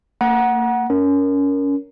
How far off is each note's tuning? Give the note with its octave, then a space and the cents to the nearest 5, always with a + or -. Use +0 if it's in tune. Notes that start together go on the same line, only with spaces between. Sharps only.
A#3 -35 F#5 +0 A#5 +35
C#4 +20 A#4 +0